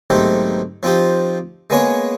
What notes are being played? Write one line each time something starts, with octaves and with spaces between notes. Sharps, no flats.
B1 G#2 D#3 A3 C4 G4
F3 C4 D#4 F4 G4
G#3 A#3 B3 C#4 G#4 C#5